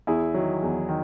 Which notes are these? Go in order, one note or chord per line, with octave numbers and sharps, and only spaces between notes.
E2 E4 G#4
D#3 F#3
E2
D#3